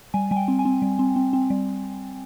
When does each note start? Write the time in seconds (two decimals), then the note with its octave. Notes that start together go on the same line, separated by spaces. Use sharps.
0.14 G3 G#5
0.31 G3 G#5
0.36 G5
0.48 C4
0.59 G#5
0.65 C4
0.82 G3
0.99 C4
1.16 C4
1.33 C4
1.50 G3